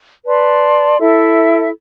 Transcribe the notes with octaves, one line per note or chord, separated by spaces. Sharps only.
B4 D5 A5 C6
E4 A4 E5